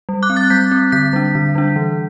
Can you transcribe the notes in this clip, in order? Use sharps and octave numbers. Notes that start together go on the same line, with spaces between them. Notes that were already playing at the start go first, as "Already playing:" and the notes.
G3
D6 F#6
C4
F#6 A6
G3 G6 B6
C4
D3 G6 B6
G3 D4
D3
G3 D4
E3